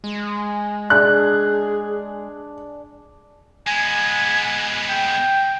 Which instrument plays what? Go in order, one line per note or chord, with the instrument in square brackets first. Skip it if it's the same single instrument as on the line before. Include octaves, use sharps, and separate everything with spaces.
[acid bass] G#3
[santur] D4 [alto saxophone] G#4 [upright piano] F#6
[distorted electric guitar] G#3 B3 [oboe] G#5
[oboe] G5